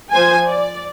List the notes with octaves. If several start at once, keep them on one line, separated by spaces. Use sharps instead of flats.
F3 C5 G#5
D5